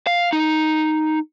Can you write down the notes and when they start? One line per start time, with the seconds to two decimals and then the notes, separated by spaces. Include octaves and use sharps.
0.07 F5
0.33 D#4